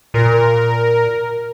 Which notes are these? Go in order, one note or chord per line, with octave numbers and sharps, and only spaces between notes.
A#2 A#4